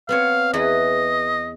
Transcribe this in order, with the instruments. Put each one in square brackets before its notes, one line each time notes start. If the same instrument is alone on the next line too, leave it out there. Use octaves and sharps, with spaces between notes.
[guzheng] B3 C4 C#5 [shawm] F5
[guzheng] E2 E3 B4 [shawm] D#5